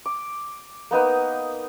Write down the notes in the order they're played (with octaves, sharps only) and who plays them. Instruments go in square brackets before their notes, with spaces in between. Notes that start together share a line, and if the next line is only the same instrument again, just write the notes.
[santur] D6
A#3 B3 D#4 B4